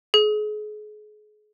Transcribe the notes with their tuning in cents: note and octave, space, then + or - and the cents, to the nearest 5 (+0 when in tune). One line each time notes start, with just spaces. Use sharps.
G#4 +35